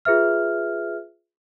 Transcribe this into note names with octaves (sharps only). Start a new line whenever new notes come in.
F4 G#4 B4 E5 F6